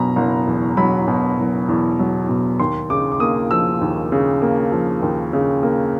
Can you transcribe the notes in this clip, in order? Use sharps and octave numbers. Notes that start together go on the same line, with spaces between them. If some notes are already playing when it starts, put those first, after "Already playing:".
Already playing: F#1 B2 F#3 A#5 B5
F#1
E2
F#3 B5
B2
F#1
E2
F#3
B2
D#2 C6
C#3 D6
D6
A#3 D#6
F3 E6
D#2
C#3
A#3
F3
D#2
C#3
A#3